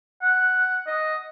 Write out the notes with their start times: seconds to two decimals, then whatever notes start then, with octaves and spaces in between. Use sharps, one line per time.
0.22 F#5
0.87 D#5